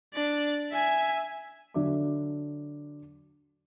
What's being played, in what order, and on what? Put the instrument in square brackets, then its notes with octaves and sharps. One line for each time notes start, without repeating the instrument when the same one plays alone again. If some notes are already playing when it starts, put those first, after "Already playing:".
[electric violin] D4 D5
E5 G#5
[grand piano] D3 F#3 D4 E5 D6